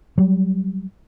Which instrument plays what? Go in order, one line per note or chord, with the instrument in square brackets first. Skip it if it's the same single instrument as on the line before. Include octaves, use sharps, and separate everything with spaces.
[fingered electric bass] F#3 G3